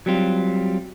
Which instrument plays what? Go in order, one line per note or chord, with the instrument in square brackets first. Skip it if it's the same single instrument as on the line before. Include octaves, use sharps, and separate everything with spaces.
[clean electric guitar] F#3 G3 C4 F4